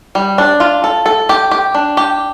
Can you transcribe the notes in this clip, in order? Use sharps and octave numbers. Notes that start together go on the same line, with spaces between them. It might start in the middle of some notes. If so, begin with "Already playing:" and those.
G3
D4
F4
A4
A4
G4
G4
D4
G4